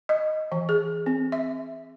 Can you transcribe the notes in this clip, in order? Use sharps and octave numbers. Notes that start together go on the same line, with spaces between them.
D#5
E3
G#4
C4
E5